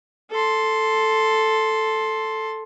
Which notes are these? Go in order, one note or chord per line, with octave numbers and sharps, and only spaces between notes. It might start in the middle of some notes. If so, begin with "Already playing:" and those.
A4 C6